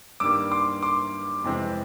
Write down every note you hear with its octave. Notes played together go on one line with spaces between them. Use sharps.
G2 D#3 G3 A#3 D6 E6
C6 D6
C6 D6
F2 C3 E3 G#3 C4